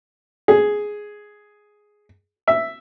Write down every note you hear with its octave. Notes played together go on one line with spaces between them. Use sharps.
G#4
E5